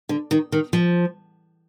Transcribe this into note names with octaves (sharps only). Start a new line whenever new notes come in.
D3
D#3
D#3
F3